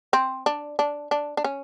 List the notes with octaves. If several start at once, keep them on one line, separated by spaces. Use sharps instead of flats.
C4
D4
D4
D4
D4
C#4